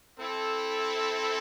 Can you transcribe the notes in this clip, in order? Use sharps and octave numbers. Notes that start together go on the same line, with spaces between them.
C4 E4 A4